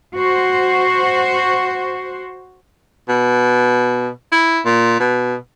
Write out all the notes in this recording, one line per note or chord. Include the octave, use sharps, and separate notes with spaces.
F#4 C5
B2
E4
A#2
B2